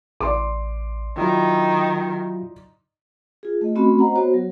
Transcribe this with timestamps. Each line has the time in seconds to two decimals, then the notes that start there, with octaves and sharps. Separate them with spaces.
0.21 A1 D5 C6 D6
1.17 D#3 F#3 E4 F4
3.43 F4 G#4
3.61 A3 D#5
3.75 A3 C4 C#4 F#4 B5
3.99 C5 D#5 F#5 A#5
4.15 B3 F#4 C5 C#5
4.34 F#3